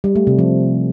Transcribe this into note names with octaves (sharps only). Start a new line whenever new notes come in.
G3
A3
C3
F3